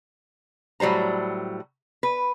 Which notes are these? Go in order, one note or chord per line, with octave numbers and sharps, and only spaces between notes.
A2 F#3 G3 C5 A#5
B4